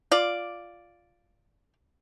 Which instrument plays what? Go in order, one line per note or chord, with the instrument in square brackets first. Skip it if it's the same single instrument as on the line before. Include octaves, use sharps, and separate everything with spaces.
[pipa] F4 D5